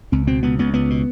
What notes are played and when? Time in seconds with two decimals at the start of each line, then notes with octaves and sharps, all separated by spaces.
0.12 C#2 C4
0.27 B2 C4
0.43 C#2 B3
0.59 C#2 B3
0.74 C#2 B3
0.90 B2